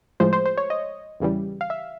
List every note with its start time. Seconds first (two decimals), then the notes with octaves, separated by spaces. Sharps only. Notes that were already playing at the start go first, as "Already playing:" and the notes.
0.20 A2 F3 G#3 C5
0.33 C5
0.46 C5
0.58 C#5
0.70 D#5
1.20 E2 C#3 E3 G3
1.61 F5
1.70 E5